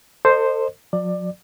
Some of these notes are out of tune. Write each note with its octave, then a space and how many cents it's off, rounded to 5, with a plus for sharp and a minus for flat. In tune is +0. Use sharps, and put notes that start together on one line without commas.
A4 +35 C5 +0 D#5 -35
F#3 -45 D5 +20